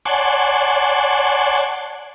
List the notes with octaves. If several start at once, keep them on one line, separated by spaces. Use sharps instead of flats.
C#5 D5 F#5 G#5 A5 C6